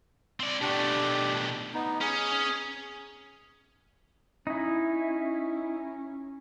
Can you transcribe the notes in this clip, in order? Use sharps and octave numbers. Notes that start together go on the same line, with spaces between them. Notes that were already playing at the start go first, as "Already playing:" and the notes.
C4 D5
B2 A3 D4 G4
B3 D#4
C#4 G#4
C#4 D#4 E4